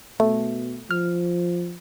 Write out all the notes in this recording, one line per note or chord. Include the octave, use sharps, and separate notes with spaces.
B2 A3
F3 F6